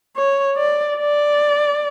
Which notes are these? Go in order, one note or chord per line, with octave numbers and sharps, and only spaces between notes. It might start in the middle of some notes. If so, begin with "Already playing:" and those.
C#5
D5
D5